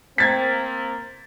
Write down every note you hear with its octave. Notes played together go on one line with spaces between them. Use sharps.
A#3 C4 G#6 A6 B6